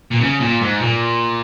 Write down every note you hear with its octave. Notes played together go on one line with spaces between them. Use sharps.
A#2
C#3
A#2
G#2
A#2